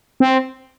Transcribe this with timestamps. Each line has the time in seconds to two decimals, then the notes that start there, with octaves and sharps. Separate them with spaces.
0.20 C4